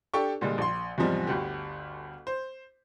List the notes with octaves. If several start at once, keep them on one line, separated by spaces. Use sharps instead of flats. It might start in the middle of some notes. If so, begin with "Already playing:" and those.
D4 G4 A4 G5 C#6
A#2 D3 G3 G#3 D4 F4
A#1 C6
E2 G#2 C3 F3 G3
G1 D2 G4
C5